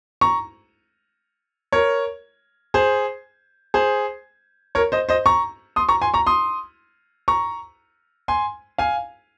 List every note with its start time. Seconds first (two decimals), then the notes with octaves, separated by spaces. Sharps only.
0.21 A#5 C#6
1.72 A#4 C#5
2.74 G#4 C5
3.74 G#4 C5
4.75 A#4 C#5
4.92 C5 D#5
5.09 C5 D#5
5.26 A#5 C#6
5.76 C6 D#6
5.89 A#5 C#6
6.02 G#5 C6
6.14 A#5 C#6
6.27 C6 D#6
7.28 A#5 C#6
8.28 G#5 C6
8.78 F5 G#5